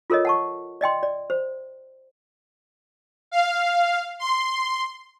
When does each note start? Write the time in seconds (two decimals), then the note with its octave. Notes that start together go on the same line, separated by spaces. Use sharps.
0.10 F4 A4 A#4 C#5 D#5
0.25 F#5 A5 C#6
0.81 D5 D#5 G5 C6
1.03 D5
1.30 C5
3.31 F5
4.19 C6